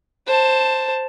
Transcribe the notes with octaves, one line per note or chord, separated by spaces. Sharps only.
C5 A5